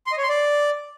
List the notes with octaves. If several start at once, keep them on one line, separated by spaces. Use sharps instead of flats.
C6
D#5
C#5
C6
D5